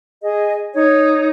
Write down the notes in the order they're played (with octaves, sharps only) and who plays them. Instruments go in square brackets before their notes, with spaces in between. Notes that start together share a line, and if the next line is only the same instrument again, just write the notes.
[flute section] G#4 D#5
D#4 C#5